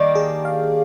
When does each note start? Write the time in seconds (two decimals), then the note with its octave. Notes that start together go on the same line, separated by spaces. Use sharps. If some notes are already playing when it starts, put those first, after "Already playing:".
Already playing: D#3 G3 A#3 D4
0.15 G#4
0.45 F5